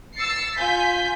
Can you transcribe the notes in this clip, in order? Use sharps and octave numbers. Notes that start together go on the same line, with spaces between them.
E6 A6 C7 C#7
F4 G#5 G6 B6